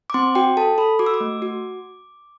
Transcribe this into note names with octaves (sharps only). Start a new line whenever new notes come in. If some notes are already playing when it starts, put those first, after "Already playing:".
D6
C4 C6
F#4 G5
A4 A5
A4 B5
F#4 D6
E6
D6
A3
F#4